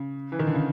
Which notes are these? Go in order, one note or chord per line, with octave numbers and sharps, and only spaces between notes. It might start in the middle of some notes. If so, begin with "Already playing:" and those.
Already playing: C#3
E3
D#3
D3
C#3